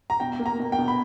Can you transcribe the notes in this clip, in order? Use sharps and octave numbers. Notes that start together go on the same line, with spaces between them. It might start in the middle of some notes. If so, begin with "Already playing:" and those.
A#5
B2 G5
A#3
A#5
B2
G5
B2
B5